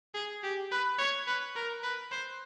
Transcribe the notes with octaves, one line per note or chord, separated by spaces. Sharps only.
G#4
G4
B4
C#5
B4
A#4
B4
C5